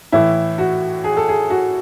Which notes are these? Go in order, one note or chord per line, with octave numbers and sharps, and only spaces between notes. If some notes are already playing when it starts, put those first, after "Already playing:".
A2 E3 A3 E4
F#4
G#4
A4
G#4
F#4